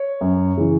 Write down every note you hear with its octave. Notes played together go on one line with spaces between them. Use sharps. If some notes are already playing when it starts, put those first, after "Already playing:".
Already playing: C#5
F#2
C#3 E3